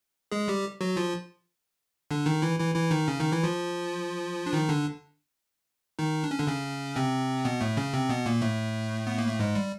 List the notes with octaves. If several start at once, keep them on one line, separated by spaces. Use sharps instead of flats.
G#3 G#4
G3 G4
F#3 F#4
F3 F4
D3 D4
D#3 D#4
E3 E4
E3 E4
E3 E4
D#3 D#4
C#3 C#4
D#3 D#4
E3 E4
F3 F4
D4
D#3 D#4
D3 D4
D#3 D#4
D4
C#4
D3 D4
C#3 C#4
C3 C4
B2 B3
A2 A3
C#3 C#4
C3 C4
B2 B3
A#2 A#3
A2 A3
B3
A#3
A3
G#2 G#3
G3